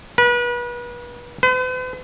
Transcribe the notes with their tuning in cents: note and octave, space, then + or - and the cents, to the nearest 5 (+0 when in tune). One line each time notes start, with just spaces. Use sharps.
B4 -35
B4 +45